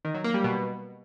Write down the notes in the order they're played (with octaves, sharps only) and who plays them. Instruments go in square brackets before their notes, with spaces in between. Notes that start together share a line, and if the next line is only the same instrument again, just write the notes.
[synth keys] D#3
F#3
A#3
G3
B2